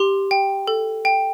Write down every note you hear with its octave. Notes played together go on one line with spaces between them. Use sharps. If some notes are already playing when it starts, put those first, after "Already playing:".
Already playing: G4 C6
G5
A4
G5